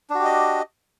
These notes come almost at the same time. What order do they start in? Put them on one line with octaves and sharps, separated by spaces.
D4 F#4 G4 D#5